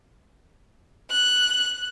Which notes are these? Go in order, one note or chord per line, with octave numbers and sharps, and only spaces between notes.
F#6